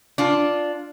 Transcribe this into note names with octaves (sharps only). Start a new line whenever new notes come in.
D4 F4